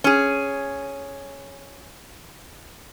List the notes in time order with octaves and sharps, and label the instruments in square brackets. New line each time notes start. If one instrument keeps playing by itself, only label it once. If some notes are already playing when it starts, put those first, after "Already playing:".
[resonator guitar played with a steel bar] C#4 G#4